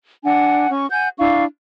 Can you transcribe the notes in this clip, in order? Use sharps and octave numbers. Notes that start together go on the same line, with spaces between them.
D4 F#5 G#5
C#4 C#6
F#5 G#5 G6
D4 E4 F5 C#6